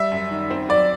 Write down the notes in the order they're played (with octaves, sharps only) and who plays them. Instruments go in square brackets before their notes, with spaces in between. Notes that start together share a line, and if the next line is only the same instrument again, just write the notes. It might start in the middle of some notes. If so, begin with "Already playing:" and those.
Already playing: [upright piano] G3 [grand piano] E5
[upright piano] F#2
D#3
C4
[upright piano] F#3 [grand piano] D5